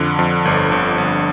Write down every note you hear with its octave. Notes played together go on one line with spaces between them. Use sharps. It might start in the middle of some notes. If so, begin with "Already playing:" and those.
Already playing: F2 D3
F2
G1
G1
G1